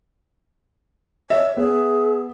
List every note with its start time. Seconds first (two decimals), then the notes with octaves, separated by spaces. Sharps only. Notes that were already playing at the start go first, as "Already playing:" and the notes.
1.30 C#5 E5
1.57 B3 G#4